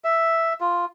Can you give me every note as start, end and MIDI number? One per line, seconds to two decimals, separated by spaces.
0.04 0.53 76
0.61 0.85 65